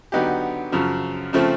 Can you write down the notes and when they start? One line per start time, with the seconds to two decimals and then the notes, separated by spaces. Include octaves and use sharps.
0.12 D3 F#3 B3 D#4 G4
0.72 F#2 C#3 F3
1.33 C#3 F3 A3 C4